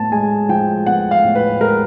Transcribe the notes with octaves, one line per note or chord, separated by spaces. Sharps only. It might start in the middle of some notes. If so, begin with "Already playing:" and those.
Already playing: A2 B3 A5
G#3 G#5
F3 G5
B3 F#5
F5
A2
B4
G#3 A#4